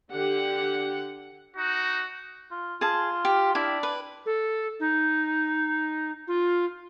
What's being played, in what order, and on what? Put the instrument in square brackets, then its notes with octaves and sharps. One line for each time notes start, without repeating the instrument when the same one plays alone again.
[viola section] D3 G4 F#5
[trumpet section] D#4 F#4
[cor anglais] F4
[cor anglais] F4 [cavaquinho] G#4 A5
[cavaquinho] G4
[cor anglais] D4 [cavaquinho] E4
[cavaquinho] B4
[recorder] A4
D#4
F4